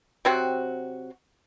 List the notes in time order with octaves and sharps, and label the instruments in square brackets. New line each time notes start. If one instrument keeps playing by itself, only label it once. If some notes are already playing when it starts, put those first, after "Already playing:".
[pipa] C3 F#3 C4 F#4